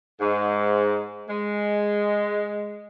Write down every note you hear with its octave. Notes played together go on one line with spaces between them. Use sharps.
G#2
G#3